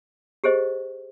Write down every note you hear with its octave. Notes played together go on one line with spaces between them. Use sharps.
G4 G#4 C5 D#5